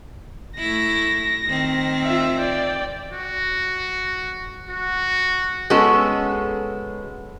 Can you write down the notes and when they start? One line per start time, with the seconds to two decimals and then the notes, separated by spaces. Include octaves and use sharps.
0.58 A3 E4 A#6
1.48 D#3 C4
2.04 F4 E5
2.40 D5 G5
3.13 F#4
4.68 F#4
5.70 G#3 B3 C#4 F#4 A4